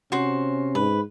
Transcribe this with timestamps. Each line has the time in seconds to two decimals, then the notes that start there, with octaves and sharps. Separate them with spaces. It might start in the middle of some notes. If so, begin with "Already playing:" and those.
0.12 C3 C#4 F#4 C5
0.75 G#2 B4